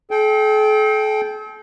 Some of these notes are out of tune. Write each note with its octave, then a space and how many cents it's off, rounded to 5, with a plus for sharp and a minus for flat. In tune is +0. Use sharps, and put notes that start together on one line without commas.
A4 -45 G5 +0